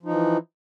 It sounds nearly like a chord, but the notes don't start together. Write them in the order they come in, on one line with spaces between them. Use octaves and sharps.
F3 D#4 E3